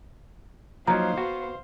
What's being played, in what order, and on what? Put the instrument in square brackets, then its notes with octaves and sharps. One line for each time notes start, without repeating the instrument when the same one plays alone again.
[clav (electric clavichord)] F3 F#3 [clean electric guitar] A#3 D#4 [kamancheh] C5 F5 [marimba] A#5
[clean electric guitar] B3 [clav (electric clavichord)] F#4